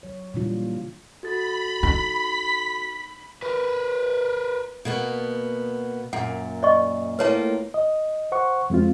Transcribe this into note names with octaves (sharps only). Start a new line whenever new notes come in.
F#3 C#5
A#2 C#3 E3 G3 D4 F4
F#4 A4 B5 A6
D#4 B6
A#4 B4
B2 A#3 B3
F#2 A#2 F#5
D5 D#5 C#6
A2 A#3 F4 B4 C#5 A5
D#5
C5 F#5 C#6
F2 G#3 C4 F4